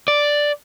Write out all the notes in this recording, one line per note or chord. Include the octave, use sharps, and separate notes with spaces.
D5